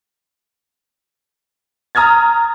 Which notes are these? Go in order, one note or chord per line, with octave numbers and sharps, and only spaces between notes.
A#5 D#6 F6 G#6 A6